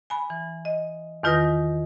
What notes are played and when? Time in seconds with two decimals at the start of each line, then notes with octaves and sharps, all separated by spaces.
0.10 G#5 B5
0.30 E3
0.65 D#5
1.23 E2 D#3 F4 B4 D#6 A#6